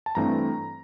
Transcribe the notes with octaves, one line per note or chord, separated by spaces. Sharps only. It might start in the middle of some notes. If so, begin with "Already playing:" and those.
A5
G2 E3 A3 C4 A#5